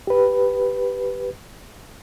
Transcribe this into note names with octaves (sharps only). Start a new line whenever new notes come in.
G4 B4